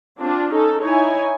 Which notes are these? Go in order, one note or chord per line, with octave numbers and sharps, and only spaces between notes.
C4 D4 F4
C#4 D#4 A4
D#4 E4 C#5 G#5